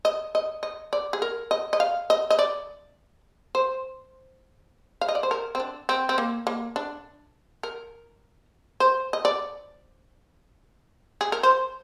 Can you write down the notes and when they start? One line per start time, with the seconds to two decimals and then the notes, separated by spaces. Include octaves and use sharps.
0.05 D#5
0.35 D#5
0.63 D#5
0.93 D5
1.13 G#4
1.22 A#4
1.51 D#5
1.73 D#5
1.80 F5
2.10 D#5
2.30 D#5
2.39 D5
3.55 C5
5.01 F5
5.09 D#5
5.15 D5
5.23 C5
5.31 A#4
5.55 C4
5.60 D4
5.89 C4
6.09 C4
6.18 A#3
6.47 A#3
6.76 D4
7.63 A#4
8.80 C5
9.13 D#5
9.25 D5
11.21 G#4
11.32 A#4
11.43 C5